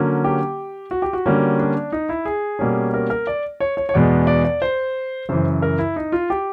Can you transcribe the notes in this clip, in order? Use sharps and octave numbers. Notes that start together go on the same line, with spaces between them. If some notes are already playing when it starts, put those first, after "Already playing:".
Already playing: D3 F#3 A#3 C#4
G4
F#4
G4
F#4
D3 G3 A#3 C#4
D4
D#4
E4
G#4
B2 G3 A#3 C#4
A#4
A#4
D5
C#5
C#5
C#5
E2 B2 G#3 B3 D5
D5
D5
C5
F#2 C#3 E3 C5
A#4
E4
D#4
F4
G4